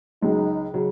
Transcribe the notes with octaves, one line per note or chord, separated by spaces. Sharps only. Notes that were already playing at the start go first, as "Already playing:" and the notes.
C#2 C#3 F#3 D#4
C#3 F#3